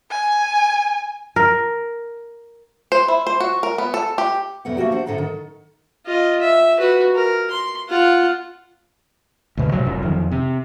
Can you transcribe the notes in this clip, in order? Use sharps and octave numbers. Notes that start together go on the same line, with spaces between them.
G#5
A#4
C5
E4
C5
F#4
A#4
B3
A4
G4
E2 B2 A3 B3 F#5
A3 A#3 F#4 G4
D4 C5 F#5
A2 D3 C4 A4 F#5 A#5
D#3
F4 D#5
E5
F#4 B4
A#4
C6
F4 F#5
D2 B2
A2 C3 D#3 F#3
F1 F#2
F2 D#3
C3